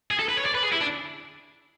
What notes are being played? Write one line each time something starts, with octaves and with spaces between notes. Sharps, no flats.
G#4
A4
B4
C#5
D5
B4
G#4
E4
D4